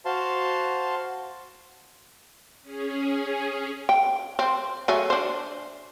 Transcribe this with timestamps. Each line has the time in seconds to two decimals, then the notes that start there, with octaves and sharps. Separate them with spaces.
0.05 F#4 C5 F5 A5 C6
2.62 C#4 G#4
3.89 G5
4.39 C4
4.88 F#3 A3 G#4
5.10 D4 C5